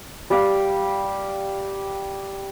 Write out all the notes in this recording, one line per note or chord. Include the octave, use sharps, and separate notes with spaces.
G3 G4 F5 G5